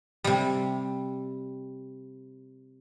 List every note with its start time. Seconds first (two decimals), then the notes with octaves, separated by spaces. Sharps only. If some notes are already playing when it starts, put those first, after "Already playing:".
0.24 C3 G3